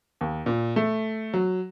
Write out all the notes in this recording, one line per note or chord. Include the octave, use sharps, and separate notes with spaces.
D#2
A#2
A3
F#3